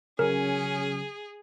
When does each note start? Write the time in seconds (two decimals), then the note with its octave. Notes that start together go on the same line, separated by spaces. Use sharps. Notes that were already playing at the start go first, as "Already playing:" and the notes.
0.19 C#3 F#3 C#4 G#4 A#4